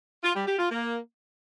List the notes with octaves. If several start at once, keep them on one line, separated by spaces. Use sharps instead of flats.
F4
G3
G4
F4
A#3